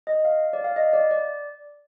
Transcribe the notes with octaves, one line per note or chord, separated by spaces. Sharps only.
D#5
F5
D5
F5
D#5
D5
D5